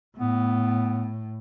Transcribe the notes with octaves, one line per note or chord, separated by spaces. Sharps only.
A2 B3